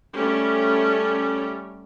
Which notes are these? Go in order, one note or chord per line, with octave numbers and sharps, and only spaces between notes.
G3 A3 C#4 G4